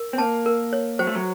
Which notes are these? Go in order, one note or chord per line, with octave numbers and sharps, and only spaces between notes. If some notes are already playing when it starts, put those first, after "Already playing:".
Already playing: A#4
C4
A#3 A5
A#4
C#5
F#3 C5
A3
F#3